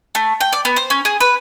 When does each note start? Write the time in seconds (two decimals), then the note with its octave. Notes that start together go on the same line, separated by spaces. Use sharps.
0.15 A3
0.41 G5
0.53 D5
0.65 B3
0.76 C5
0.90 C#4
1.05 G#4
1.20 B4